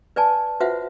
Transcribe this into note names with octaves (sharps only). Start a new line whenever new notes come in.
B4 D5 G#5 A5
F4 F#4 B4 C5 E5 F#5